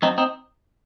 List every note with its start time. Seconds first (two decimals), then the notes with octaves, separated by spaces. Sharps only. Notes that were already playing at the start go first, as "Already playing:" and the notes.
0.02 F#2 C4 D#4
0.18 C4 D#4